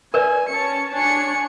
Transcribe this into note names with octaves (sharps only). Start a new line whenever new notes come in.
A#4 B4 D5 G#5
C#4 C#5 A5 C#7
D4 C#5 G#5 C#7